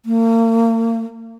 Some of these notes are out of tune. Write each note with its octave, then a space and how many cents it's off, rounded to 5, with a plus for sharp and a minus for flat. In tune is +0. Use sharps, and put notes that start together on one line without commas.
A#3 -40